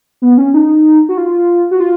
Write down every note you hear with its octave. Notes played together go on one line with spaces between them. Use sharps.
B3
C#4
D#4
F#4
F4
F#4
F4